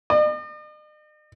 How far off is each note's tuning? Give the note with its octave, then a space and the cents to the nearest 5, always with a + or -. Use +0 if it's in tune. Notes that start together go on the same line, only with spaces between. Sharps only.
D#5 -45